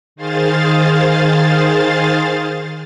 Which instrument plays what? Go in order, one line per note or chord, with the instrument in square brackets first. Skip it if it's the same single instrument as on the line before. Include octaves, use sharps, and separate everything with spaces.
[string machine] D#3 G#4 C5 F5 A6